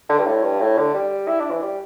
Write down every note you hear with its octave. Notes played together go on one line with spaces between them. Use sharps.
D3
G2
A2
G2
A2
D3
G3
E4
D4
E3
G3